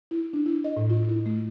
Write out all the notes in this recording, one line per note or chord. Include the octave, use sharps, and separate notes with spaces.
E4
D4
E4
D#5
A2
F4
E4
A3